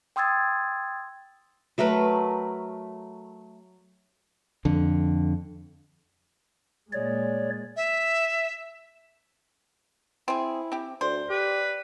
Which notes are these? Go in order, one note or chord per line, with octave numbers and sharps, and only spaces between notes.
G5 C6 D#6 E6 G#6 A6
F#3 A3 A#4 B4
F2 D3
A#2 G#3 C#5 D5
E5
C4 E4 G#4
C4 G4
D2 C5 D5
G4 B4